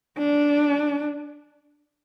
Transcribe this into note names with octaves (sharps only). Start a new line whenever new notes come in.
D4